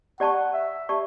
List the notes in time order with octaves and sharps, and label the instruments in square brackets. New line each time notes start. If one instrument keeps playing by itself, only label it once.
[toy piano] G4 D5 A5 C#6 [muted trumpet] F#5
[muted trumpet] E5
[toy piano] G4 D5 A5 C#6